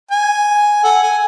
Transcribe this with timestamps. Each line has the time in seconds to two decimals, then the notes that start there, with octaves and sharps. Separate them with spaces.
0.12 G#5
0.84 A4 F#5
1.03 G#5